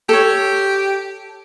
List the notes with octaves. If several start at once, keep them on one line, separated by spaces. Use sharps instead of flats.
G4 A4 C#5